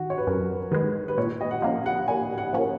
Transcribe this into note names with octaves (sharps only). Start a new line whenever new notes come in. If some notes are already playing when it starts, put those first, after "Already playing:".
Already playing: D#3 F#4
C#5
B4
F#2 A#4
D#3 G#3 B4
B4
A#2 C#5
D#5
F#5
F3 A#3 C#4 F5
F#5
A#2 G#5
F#5
F3 A#3 C#4